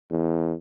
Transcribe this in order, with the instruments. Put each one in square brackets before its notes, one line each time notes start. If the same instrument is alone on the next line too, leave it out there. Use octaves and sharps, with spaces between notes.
[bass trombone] E2